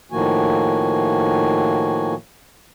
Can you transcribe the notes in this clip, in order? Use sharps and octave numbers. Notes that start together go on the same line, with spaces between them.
A2 D#3 F3 A#3 F#4 G#5